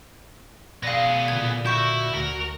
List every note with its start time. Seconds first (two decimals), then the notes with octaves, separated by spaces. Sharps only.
0.83 B2 B3 G#4 D5 F5 A#6
1.28 A#2 D3 G#6
1.66 E4 F#4 C#6 G6
2.14 D2 A#4